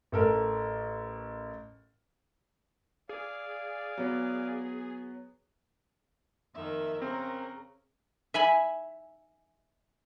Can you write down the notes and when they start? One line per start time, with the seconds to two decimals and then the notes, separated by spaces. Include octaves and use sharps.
0.12 A1 A4 A#4
3.09 G#4 D5 F5
3.98 F#3 B3
6.55 F2 D#3 A#3 E5
7.02 C#3 C4 A#4
8.34 E5 G#5 B5